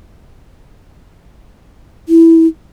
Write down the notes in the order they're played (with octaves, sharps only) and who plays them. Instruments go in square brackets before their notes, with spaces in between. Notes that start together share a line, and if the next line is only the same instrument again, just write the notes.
[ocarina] E4